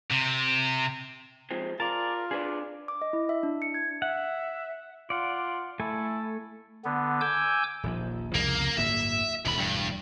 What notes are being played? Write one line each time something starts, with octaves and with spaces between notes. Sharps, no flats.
C3
F3 G#3 C4
F4 G#4 A#4 D5 A5
D4 G#4 B4 D5
D6
D#5
E4
E5
D4
C#7
G#6
E5 F#5
F4 D5 F#5
A3 E4 A4 G#5
D3 B3
G#5 D6 E6 G6
D#1 A#1 F3
C2 F2 C#3 A#3
D1 G1 A#3 E5
E1 D2 C3 B5
G2